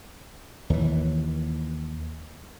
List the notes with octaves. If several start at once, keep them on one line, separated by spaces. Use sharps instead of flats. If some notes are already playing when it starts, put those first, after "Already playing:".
D#2 E3